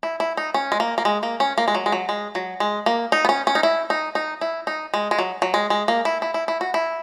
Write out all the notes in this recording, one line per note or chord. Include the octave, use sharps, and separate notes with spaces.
E4
E4
D#4
C#4
G#3
A#3
A#3
G#3
A#3
C#4
A#3
G#3
F#3
G#3
F#3
G#3
F#3
G#3
A#3
D#4
B3
C#4
C#4
D#4
E4
D#4
D#4
E4
D#4
G#3
G#3
F#3
F#3
G#3
G#3
A#3
E4
E4
E4
E4
F#4
E4